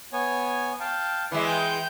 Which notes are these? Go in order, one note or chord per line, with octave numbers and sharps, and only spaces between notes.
B3 C#5 G#5
F5 G5 A5
E3 G#3 E4 B4 D5
G5 G6